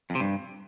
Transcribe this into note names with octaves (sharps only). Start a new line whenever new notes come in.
F2
C3
G2